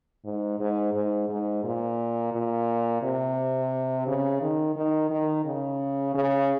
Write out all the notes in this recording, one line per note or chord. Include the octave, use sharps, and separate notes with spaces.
G#2
G#2
G#2
G#2
A#2
A#2
C3
C#3
D#3
D#3
D#3
C#3
C#3